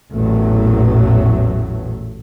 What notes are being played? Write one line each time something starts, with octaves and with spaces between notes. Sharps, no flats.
A1 E2 A#2 F#3 A3